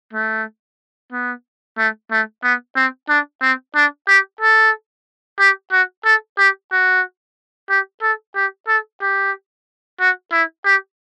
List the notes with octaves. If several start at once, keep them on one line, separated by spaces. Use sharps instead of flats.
A3
B3
A3
A3
B3
C4
D4
C4
D4
G4
A4
G4
F#4
A4
G4
F#4
G4
A4
G4
A4
G4
F#4
E4
G4